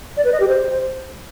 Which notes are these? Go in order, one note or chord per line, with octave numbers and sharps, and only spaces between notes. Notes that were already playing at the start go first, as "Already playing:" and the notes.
D5
B4
D#5
G4
C5